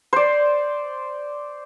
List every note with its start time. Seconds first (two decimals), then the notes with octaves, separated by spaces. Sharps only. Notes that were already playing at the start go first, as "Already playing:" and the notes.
0.13 C5 D5